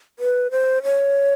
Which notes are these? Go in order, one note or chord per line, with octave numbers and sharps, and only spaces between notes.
B4
C5
C#5